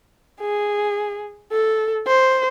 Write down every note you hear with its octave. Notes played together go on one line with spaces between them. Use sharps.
G#4
A4
C5